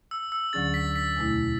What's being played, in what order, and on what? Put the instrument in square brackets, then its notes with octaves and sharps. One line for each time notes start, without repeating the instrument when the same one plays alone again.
[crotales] E6
E6
[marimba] D2 D3 F#3 C#4 G#4 [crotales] A6
[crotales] B6
B6
[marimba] E2 B2 A3 E4